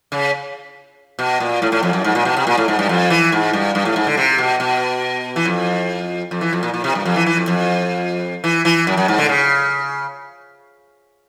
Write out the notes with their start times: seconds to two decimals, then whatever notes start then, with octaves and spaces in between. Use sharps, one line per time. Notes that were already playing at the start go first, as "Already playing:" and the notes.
0.12 C#3
1.19 B2
1.40 A#2
1.62 A2
1.72 A2
1.83 F2
1.93 F#2
2.04 G#2
2.15 A#2
2.25 B2
2.37 C3
2.47 A#2
2.58 A2
2.68 G#2
2.79 G2
2.89 F2
3.10 E3
3.32 G#2
3.53 G2
3.75 G2
3.85 A2
3.96 G#2
4.07 D3
4.17 C3
4.38 B2
4.60 B2
5.36 E3
5.45 F2
6.31 F2
6.41 E3
6.53 F2
6.63 A#2
6.74 A#2
6.84 C3
6.95 G2
7.05 F2
7.16 E3
7.26 E3
7.37 F2
7.48 F2
8.44 E3
8.65 E3
8.87 F#2
8.97 F#2
9.08 G#2
9.18 D3
9.29 C#3